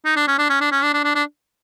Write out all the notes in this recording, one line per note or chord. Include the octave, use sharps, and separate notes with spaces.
D#4
D4
C#4
D4
C#4
D4
C#4
D4
D4
D4
D4